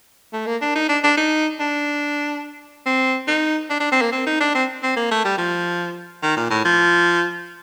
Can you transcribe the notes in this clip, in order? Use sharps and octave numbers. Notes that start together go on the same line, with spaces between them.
A3
A#3
D4
D#4
D4
D4
D#4
D4
C4
D#4
D4
D4
C4
A#3
C4
D#4
D4
C4
C4
A#3
A3
G3
F3
D#3
A#2
A2
F3